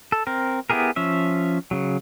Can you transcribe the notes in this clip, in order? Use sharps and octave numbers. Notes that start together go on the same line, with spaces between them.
A4
C4 A#4
B3 E4 G4 G#4 A#4
F3 C#4 E5
C#3 F#3